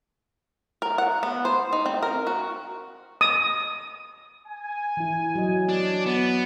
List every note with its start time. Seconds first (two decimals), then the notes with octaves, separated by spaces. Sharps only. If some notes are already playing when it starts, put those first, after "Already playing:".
0.82 A#4
0.98 F#5
1.23 B3
1.45 C5
1.73 D#4
1.86 C4
2.03 A#4
2.27 F#4
3.21 D#6
4.47 G#5
4.97 E3 E4
5.35 F#3 D#5
5.69 D4
6.06 B3